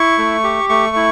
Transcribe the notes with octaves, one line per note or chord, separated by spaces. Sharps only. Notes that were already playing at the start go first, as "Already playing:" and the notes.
Already playing: E4 C#6
A3
G4
A3 C#6
E4